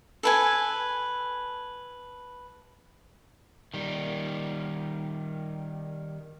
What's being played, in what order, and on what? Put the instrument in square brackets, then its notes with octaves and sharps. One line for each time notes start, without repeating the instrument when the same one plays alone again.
[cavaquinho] A4 B4 G#5
[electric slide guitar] D#3 G3